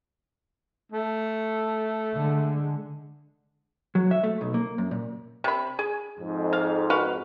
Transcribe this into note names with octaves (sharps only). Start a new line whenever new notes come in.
A3
D3 G#3
F#3
E5
A3
B1
A#3
F#2
A#2
C3 B5
G#4
F2 G#2
F5
F#4 B4 F5